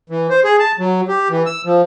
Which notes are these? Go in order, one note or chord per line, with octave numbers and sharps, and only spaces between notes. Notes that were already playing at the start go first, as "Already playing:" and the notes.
E3
C5
G#4
A5
F#3
G4
E3
E6
F3